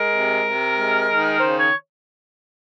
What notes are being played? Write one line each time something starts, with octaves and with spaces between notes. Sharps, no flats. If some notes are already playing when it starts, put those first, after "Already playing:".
Already playing: G#3 A#4
C3
C3
G#3
D#3
C#3 C5
C#5